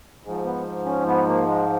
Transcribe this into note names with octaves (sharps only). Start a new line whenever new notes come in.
G#2 F3 G#3
B3
C#4
B3
A#3
G#3